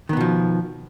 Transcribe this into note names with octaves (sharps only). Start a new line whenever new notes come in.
B2 D#3 F3 B3